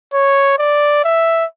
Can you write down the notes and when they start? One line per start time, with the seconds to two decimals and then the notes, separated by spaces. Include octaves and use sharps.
0.14 C#5
0.59 D5
1.04 E5